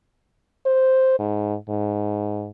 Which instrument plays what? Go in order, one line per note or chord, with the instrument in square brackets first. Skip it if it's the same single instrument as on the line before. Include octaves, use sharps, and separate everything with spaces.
[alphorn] C5
G#2
G#2